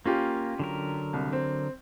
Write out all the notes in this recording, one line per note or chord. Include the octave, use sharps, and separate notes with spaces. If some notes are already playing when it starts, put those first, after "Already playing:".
A#3 C#4 F4 G4
D3 F#3 A#4
C2
C4